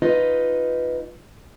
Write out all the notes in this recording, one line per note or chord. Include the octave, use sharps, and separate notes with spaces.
D#4 F4 B4 D#5